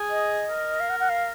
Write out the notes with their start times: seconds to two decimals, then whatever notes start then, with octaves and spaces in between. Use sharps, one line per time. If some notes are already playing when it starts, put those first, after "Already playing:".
Already playing: G#4
0.10 D#5
0.50 A#4
0.80 F5
0.89 F#5
1.00 F#5
1.09 F5